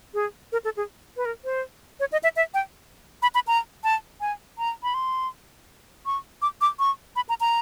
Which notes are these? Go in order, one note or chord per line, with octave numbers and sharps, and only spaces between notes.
G#4
A#4
A4
G#4
B4
A#4
C5
C#5
D#5
E5
E5
G5
B5
B5
A#5
A5
G#5
A#5
B5
C6
C#6
D6
D6
C#6
B5
A#5
A#5